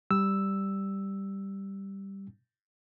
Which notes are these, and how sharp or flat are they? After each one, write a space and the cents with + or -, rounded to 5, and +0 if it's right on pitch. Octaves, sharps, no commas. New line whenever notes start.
G3 +0 E6 +0